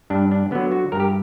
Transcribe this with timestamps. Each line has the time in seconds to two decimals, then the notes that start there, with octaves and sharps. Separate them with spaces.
0.10 G2 D4
0.31 D4
0.51 D3 F#3 B3
0.72 F#4
0.92 G2 A#4
1.00 G4